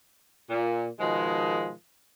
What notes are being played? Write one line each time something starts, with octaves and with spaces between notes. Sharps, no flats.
A#2
B2 D#3 F3 G#3